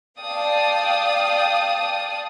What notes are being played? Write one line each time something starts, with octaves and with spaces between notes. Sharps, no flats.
D5 F5 G5 A5 D#6